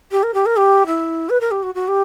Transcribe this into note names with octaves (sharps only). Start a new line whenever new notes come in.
G4
A#4
G4
A#4
G4
E4
B4
A#4
G4
F#4
F#4
G4